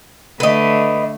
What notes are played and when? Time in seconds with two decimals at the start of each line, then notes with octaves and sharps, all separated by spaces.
0.40 D3 A3 B4 D#5